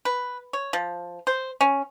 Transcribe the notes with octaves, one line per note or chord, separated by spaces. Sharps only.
B4
C#5
F3
C5
C#4